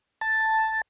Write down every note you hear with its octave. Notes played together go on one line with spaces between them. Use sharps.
A5